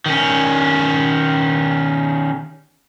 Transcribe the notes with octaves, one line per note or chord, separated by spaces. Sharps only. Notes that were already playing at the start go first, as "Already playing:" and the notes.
D#3 C#4